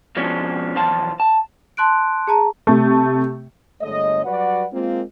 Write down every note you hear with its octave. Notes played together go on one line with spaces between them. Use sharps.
F2 B2 F3 G#3 C#4 D4
B1 E2 F3 F4 A5
A5
A5 C6 F#6 D7
G#4 A5 A#5
C3 A3
G1 D3 G#3 A3 C#5 D#5
F#3 G3 F#4 B4 D5 F#5
G#3 A#3 C4 F4